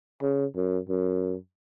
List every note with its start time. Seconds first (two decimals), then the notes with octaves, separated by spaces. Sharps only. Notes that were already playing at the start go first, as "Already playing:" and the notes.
0.22 C#3
0.55 F#2
0.89 F#2